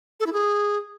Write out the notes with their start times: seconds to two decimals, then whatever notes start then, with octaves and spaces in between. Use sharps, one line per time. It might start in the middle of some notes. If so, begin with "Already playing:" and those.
0.20 A4
0.26 E4
0.33 G#4